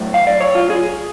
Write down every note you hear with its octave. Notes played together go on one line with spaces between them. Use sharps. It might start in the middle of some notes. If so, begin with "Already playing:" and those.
Already playing: A2 F#3
F5
D5
C#5
F4
G#4